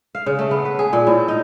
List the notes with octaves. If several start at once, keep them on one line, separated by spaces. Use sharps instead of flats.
F5
C#3
A3
B3
B4
G#4
A#2
A2
D#4